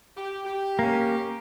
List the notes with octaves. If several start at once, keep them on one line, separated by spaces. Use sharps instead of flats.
G4
G4
A#3 C#4